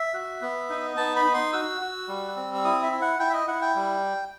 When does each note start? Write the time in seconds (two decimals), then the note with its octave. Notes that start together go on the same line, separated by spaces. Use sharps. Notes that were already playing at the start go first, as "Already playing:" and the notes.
Already playing: E5
0.14 F#4
0.42 B3
0.69 D#4
0.97 B3 A5
1.16 B5
1.25 D#4
1.34 C6
1.53 F#4 E6
1.81 F#4
2.08 G3
2.36 C4
2.54 E6
2.64 E4 D#6
2.83 E5
2.92 E4
3.02 F#5
3.19 E4 G5
3.30 E5
3.34 D#5
3.47 E4 F#5
3.62 G5
3.75 G3